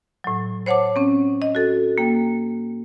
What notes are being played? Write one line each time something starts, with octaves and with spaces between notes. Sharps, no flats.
A2 F#3
C5 C#5 F#5 A5 D6
C4 C#4
D#5
F#4 A4
A#3 G5